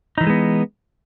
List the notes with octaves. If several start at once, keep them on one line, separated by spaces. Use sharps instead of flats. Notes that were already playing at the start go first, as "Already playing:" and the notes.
E3 F#3 G#3 B3 D#4